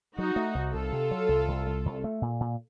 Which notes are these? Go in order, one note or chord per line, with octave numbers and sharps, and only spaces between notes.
F#3 D#4 F#4
A3
C2
C2 F4 A4
C3
F#3
C2
C2
C2
C2
A3
A#2
A#2